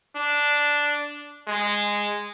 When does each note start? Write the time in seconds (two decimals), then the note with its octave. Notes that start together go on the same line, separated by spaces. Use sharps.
0.16 D4
1.48 G#3